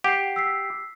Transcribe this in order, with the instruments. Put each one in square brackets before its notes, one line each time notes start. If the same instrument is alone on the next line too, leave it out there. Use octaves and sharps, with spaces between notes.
[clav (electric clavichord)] G4 [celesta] F#5 C7
[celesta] E6 B6 C7